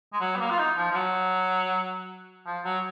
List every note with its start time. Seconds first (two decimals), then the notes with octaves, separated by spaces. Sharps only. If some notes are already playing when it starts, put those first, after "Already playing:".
0.13 G#3
0.20 F#3
0.36 B3
0.40 A#3
0.50 F4
0.58 D#4
0.77 F3
0.91 F3
0.95 F#3
2.46 F3
2.64 F#3